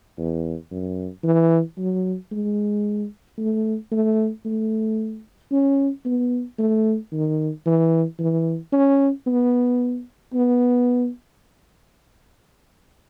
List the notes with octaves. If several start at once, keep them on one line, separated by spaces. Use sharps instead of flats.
E2
F#2
E3
F#3
G#3
A3
A3
A3
C#4
B3
A3
D#3
E3
E3
C#4
B3
B3